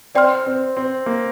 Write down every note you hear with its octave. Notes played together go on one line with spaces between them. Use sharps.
C4 D5 G5 C6 F6
C4
C4
A#3